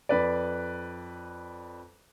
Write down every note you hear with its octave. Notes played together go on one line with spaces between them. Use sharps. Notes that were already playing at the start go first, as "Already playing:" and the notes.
F2 B4 D5